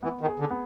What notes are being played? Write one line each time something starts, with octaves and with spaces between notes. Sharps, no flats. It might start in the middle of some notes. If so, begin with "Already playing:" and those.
E3 B3
D#3
G#4
D3
B3